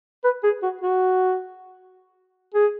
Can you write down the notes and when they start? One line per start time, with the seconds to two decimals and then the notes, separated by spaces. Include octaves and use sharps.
0.24 B4
0.44 G#4
0.63 F#4
0.82 F#4
2.54 G#4